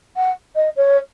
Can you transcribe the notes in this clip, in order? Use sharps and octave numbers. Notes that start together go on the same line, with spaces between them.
F#5
D#5
C#5